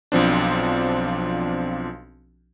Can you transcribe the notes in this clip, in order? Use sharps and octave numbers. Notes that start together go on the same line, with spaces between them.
B1 F3 C4 D4